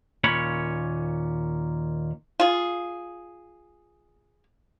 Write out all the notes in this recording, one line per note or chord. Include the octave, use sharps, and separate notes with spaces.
D#2 A#2 C#4 C#5 B5
F4 G#4